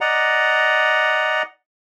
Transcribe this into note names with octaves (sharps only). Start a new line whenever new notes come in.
D5 D#5 F#5 A#5